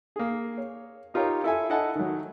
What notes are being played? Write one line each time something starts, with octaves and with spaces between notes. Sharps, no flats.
A#3 G#4
C#5
D#4 F4 G4 A#4 C#5 F5
E4 A4 E5 G#5
E4 A4 D#5 F#5 G#5 A5
D#3 F#3